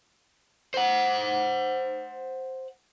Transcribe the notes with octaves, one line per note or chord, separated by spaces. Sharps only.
C5 F#5